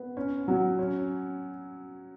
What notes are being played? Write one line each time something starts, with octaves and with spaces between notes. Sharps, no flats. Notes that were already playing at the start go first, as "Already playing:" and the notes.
Already playing: B3
C#4
F#3
C#4